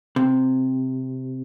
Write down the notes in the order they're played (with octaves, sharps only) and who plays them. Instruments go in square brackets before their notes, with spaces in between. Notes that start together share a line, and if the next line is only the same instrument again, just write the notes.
[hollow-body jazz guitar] C3